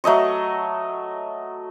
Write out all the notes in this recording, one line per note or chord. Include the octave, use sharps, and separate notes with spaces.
F#3 A3 D#5 C#6